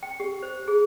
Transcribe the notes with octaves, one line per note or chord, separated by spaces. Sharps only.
G5
G4
C5
G#4